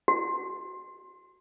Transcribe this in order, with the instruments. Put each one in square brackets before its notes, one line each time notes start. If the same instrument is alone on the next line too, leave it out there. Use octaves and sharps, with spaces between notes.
[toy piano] F#4